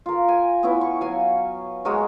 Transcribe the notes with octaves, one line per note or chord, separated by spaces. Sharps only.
F4 A#4
G#5
B3 C#4 E4
C#6
F#3 F5 G#5
G#3 F#4 A#4 C#5